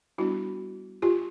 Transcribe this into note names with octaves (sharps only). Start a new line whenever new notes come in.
G3 B3 D4 E4 F#4
F4 G4